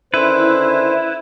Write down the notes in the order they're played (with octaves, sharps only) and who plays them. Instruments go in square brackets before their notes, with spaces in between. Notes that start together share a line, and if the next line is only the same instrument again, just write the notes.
[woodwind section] D3 D#3 C#4 [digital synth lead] E4 [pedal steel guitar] B4 [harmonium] C5